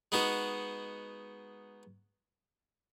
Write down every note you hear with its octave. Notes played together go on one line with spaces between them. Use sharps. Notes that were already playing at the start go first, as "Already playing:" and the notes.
G#3 B3 D#4 F#4